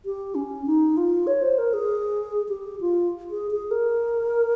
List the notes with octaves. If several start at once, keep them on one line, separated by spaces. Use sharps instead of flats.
G4
C#4
D#4
F4
C#5
C5
A#4
G#4
G4
F4
G#4
G#4
A#4